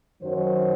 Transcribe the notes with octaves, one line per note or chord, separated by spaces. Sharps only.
F#2 D#3 F#3 C5